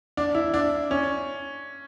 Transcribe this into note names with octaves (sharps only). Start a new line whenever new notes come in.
D4
E4
D4
C#4